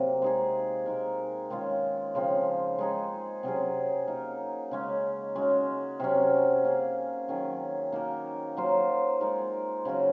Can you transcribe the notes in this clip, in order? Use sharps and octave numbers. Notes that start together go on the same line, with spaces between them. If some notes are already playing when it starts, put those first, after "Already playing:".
Already playing: C3 F#3 A#3
G#3 D#4 G#4
G#3 D#4 A#4
D#3 G#3 C#4 F4
C#3 F3 C4
G#3 D#4 G#4
C3 F#3 C#4 G#4
A#3 D#4 A#4
C#3 G#3 C#4
G#3 C#4 F#4
C3 F#3 C#4
A#3 C#4 G#4
D#3 F#3 C#4 G#4
A#3 D#4 F#4 A#4
F#3 A#3 F4 C5
G#3 D#4 A#4
C#3 F#3 C#4 F#4